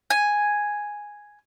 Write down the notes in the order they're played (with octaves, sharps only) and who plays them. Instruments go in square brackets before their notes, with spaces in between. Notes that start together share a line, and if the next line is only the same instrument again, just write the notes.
[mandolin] G#5